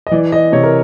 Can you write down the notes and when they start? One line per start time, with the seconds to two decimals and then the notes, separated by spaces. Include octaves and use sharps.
0.07 D#5
0.11 E3 D5
0.32 D#5
0.52 C3 C#5
0.63 A#4